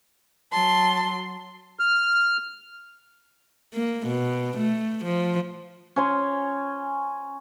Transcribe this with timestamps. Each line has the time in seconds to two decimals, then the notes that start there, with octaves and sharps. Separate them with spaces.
0.52 F#3 A5 C6
1.79 F6
3.74 A#3
4.07 B2
4.58 A3
5.05 F3
5.96 C#4 G#5 C6